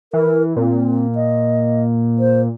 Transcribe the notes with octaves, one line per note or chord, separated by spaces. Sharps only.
E3 A#4
A#2 C4
D#5
C5